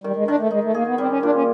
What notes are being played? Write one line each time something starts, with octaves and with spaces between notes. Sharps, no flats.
D#3 G3
G#3
D#3 D4
A3
G#3 D#4
A3
A#3 G#4
B3
G3 C4
C#4
A#2 D4
C#4